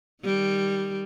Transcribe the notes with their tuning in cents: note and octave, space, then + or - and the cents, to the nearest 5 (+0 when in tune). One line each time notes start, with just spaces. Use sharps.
D#3 +0 G3 +0